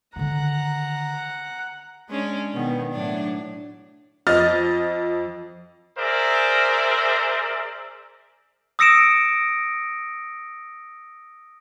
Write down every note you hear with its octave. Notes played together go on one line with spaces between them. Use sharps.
D3 D#3 F#5 A#5
G#3 C#4 D4
B2 D#3 B3
A2 F#3 D4
F2 D#5 F6 A6
G#4 A#4 C5 D5 E5
D#6 E6 A#6 C#7 D7 E7